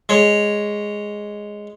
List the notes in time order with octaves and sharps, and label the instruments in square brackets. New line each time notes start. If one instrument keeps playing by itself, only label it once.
[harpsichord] G#3 C#5